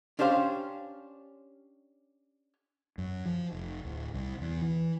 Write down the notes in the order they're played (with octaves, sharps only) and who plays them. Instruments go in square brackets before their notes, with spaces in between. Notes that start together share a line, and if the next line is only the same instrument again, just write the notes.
[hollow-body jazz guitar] C#4 D4 G4 C5 F5
[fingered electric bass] F#2
F3
F1
D1
C2
E2
E3